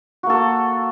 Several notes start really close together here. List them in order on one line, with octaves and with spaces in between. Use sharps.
F#4 A#3 A4